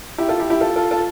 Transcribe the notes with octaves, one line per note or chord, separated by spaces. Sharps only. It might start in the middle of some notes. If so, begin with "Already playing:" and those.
E4 G4
F4 A4
E4 G4
E4 G4
F4 A4
F4 A4
F4 A4